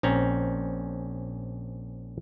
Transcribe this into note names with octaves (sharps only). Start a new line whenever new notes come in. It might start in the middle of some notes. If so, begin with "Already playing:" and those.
A#1 C4 C#4 A#5